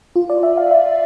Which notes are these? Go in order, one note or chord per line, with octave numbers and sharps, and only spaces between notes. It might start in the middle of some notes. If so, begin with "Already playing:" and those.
F4
D5
E5
F5
E5